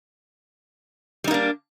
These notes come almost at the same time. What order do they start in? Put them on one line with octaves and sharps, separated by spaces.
G3 D#4 A#3 D4